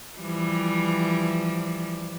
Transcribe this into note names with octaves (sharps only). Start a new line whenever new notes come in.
E3 F3 G3